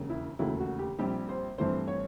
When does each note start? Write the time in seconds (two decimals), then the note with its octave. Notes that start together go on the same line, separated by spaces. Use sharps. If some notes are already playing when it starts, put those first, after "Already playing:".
Already playing: E1 D#2 C#3
0.10 E4
0.39 E1 D#2 C#3 F#3 A3 E4
0.60 F#4
0.79 G4
0.99 A#1 A#2 G3 C4 G4
1.29 C5
1.58 G2 E3 A3 C4 C5
1.88 C#5